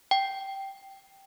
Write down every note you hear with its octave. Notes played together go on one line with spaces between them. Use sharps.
G5